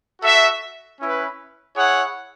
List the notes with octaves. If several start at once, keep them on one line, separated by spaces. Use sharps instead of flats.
F#4 A4 E5
C#4 E4 B4
E4 G#4 C#5 F#5